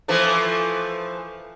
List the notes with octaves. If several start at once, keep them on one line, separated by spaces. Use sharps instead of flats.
E3 F3 A3